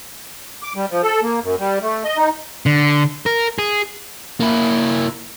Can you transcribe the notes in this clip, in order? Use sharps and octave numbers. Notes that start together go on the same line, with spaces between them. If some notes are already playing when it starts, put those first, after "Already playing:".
D6
G3
F3
A4
A#3
F#2
G3
A3
D#5
D#4
D3
A#4
G#4
A#3 E4